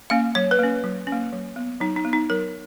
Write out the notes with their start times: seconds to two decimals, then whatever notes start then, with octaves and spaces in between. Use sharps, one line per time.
0.10 A#3 C#4 F5
0.35 F#3 C#5
0.51 B4
0.59 A#3 C#4
0.84 F#3
1.07 C#4
1.12 A#3
1.33 F#3
1.56 B3
1.80 F#3 D#4
1.96 D#4
2.05 B3
2.13 D#4
2.30 F#3 A#4